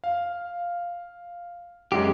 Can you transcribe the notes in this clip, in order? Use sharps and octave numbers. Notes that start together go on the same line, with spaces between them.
F5
F#2 G#3 C#4 G4